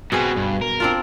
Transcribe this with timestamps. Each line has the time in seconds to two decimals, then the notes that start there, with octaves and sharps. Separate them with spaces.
0.12 B2 B3 C4 F#4 G#4 B4
0.37 G2
0.61 A#4
0.80 C4 D4 F4